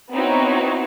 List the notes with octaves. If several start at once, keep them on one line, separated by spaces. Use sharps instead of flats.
B3 C4 D#4 E4 F#4 C#5